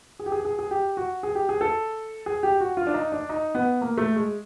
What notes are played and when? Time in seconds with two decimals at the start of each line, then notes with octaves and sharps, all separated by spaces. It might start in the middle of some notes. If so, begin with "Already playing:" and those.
0.19 G#4
0.26 G4
0.32 G#4
0.45 G#4
0.59 G#4
0.71 G4
0.97 F#4
1.23 G#4
1.35 G4
1.49 G#4
1.61 A4
2.26 G#4
2.43 G4
2.61 F#4
2.77 F4
2.87 D4
2.94 D#4
3.12 D4
3.29 D#4
3.55 B3
3.81 A#3
3.98 A3
4.16 G#3